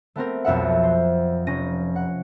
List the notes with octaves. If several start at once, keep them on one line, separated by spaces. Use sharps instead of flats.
A3 B3 C4 A#4
B1 F2 E5 F#5
C5
F1 C#4 A#6 D#7
F#5